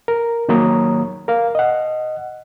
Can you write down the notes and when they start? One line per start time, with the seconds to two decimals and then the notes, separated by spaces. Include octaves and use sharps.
0.08 A#4
0.49 D#3 F#3 A#3 C#5 A#5 D#6
1.28 A#4 F5
1.55 D#5 F#5